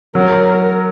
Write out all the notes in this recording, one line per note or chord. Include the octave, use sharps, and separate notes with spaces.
F#3 A#4